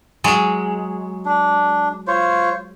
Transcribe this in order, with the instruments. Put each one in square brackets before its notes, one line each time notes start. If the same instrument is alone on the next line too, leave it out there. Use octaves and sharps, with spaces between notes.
[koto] F#3 G#3
[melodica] D4
F4 C5 C#5